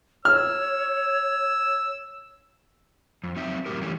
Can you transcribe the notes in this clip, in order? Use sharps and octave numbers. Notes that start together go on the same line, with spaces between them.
C#5 E6 F6
F2
F#3 C4 D#4 E5
F#2 A2 D#3 F#3 G4 A#4
E3 G3 A3 C#4